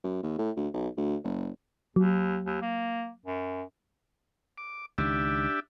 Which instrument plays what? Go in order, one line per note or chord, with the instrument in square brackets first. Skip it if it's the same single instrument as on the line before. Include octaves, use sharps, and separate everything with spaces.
[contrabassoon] F#2
D#2
A2
D2
B1
D2
F#1
[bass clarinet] D#2 [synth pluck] F#3
[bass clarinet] D#2
A#3
F#2
[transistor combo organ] D6
[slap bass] C#2 D#3 [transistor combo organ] D4 G4 E5